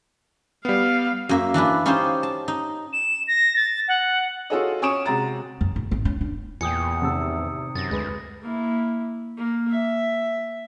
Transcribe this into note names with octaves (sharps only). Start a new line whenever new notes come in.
G3 B3 F5
F#2 A#3 E5
E3 D4 F4 B4
C#4 D#4 F4 G4 C5
A5
D#4
E7
A#6
A6
F#5
F4 F#4 G#4 A4 C#5 D#5
C#4 G#5 C#6 D#6 D7 E7
C3 G#3 F#4 A#5 A6
F#2
A2
G#1
C#4
D4
E2 A#2 G5 G#5 D#6 C#7
A2 C3 D#3 A5 E6
F#2 A6 A#6
D2 G#3 B4
A#3 E4
A#3
E5